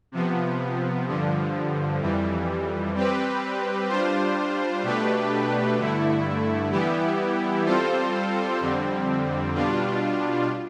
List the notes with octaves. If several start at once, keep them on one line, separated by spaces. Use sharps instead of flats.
C3 F3 B3
G2 D3 F3
F2 E3 G3
G3 C4 G4 B4
G3 D4 F4 C5
B2 A3 D4 G4 B4
G2 D3 A3 E4
E3 G3 B3 E4 G4
G3 C4 F4 A4 C5
F2 D3 G3 C4
B2 G3 D4 F4